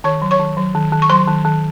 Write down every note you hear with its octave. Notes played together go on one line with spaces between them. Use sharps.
D#3 C#5 C#6
F#3
C#5 C#6
D#3
F#3
D#3
D#3
C#6
F#3 C5 C6
D#3
D#3